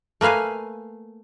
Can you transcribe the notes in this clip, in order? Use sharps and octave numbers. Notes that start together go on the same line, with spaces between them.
A3 A#3 B4 F5 G#5